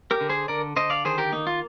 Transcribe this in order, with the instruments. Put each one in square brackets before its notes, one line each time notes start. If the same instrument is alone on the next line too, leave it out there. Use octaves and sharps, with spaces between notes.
[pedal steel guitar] G4 A#4
D3
G#4 C5
D3 A#4 D5
D3 C5 D#5
D5 F5
D#3 G#4 C5
G4 A#4
A#3 D#4
F4